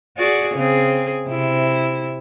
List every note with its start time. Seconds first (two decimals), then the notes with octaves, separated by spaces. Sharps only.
0.17 F#4 G#4 D5
0.55 C#3 C4 G#4
1.28 C3 E4